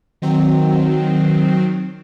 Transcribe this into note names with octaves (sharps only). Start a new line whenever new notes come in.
D#3 F#3 C4